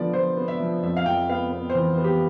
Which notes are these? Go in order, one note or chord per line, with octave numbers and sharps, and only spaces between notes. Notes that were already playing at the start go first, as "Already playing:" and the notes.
Already playing: D3 F3 B3 D5
F3 C5
B3
E5
F3
F2 E5
F5
F2 G5
B3 F5
B3
C5
E3
B3
G4